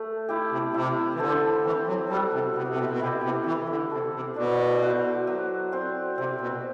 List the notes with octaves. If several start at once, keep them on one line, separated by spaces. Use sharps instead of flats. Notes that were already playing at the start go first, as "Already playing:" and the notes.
Already playing: A3
E4 G4
C3
C3 E4
E3
D3 A4 C5
E3 C4
F#3
G3 F#4 A4
C3
C3 B3
C3
B2
B2
C3 E4 G4
C3
E3 E4
D3
C3 A4 C5
C3
B2 D4
F#4 C5 E5
F#3
C4 F#4 C5
C3 C4
B2